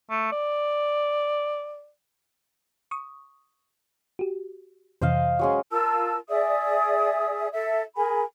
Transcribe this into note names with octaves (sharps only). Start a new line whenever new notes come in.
A3
D5
C#6 D#6
F#4 G4
F2 C3 E3 C5 D#5 F5
F#3 G#3 C#4
F4 A#4 A5 E6
G#4 D5 E5 D#6
A4 E5
G#4 A#4 G#5 B5